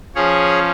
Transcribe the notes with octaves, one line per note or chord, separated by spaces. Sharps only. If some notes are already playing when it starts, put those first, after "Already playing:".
F3 C#4 G#4 C#5